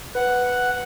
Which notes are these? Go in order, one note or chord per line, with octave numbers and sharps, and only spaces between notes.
B4 F#5